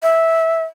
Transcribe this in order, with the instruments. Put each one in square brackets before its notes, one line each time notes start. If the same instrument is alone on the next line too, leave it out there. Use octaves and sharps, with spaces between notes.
[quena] E5